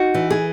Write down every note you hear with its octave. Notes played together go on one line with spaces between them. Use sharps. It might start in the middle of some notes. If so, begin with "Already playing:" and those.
Already playing: D#4 F#4
E3
G#4